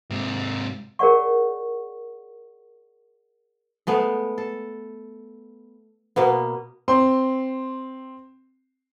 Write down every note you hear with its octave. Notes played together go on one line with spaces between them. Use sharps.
G#2 C3
G#4 A#4 C#5 D5 F#5 C#6
G#3 A3 B3
A4
B2 A#3 B3
C4 C6